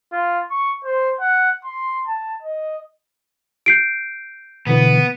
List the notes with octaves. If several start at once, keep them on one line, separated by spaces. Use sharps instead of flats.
F4
C#6
C5
F#5
C6
A5
D#5
G6 C7 D7
B2 D3 E3 B3